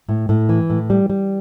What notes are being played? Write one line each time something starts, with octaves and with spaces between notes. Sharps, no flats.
A2
A2
E3
A2
G3
G3